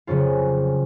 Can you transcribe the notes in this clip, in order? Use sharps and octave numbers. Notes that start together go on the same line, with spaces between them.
F2 C#3 F#3 C#4 F4